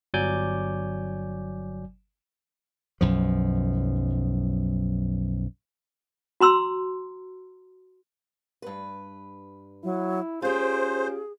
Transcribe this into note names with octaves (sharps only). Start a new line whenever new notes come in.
G1 F#3 D5 G#5 D6 G6
B1 F#2 F3
F#4 A#5 C6 E6
G2 B4
F#3 E4
C#4 F4 G4 G#4 C5